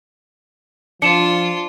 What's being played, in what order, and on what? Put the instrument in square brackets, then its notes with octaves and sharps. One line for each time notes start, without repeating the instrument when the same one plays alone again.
[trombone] F3 [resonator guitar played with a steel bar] D4 [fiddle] F4 [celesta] C#7 E7